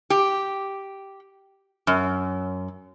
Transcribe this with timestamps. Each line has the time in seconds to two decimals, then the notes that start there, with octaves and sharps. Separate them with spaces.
0.10 G4
1.87 F#2